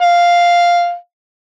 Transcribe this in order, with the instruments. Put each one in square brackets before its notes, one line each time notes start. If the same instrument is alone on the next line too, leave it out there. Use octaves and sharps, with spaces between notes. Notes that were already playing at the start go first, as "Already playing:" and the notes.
[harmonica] F5